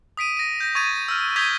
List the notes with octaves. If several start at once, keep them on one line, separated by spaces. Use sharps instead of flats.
D#6 B6 D7 D#7
A#6 D#7
G6 A#6
C#6 D#6 G#6 A6 D#7
E6 F6
C#6 D#6 G6 G#6 B6 G7